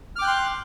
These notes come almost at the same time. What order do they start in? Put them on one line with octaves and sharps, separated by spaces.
F6 D6 G5 F#6 C6